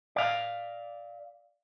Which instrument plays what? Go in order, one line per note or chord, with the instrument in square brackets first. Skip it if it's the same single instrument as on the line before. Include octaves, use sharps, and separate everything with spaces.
[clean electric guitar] D5 F5